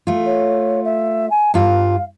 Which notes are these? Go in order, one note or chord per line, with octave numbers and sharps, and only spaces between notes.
A3 F4
C#5
E5
G#5
G2 F4 F5